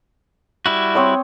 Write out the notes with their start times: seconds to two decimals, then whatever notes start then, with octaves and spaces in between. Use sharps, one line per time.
0.66 G3 E4 F#4
0.95 C4 C#5 D#6